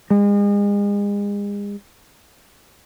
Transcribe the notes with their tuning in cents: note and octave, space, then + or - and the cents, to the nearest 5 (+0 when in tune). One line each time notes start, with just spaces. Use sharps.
G#3 -35